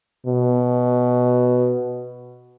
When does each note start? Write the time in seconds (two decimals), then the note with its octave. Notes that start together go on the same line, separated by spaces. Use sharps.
0.26 B2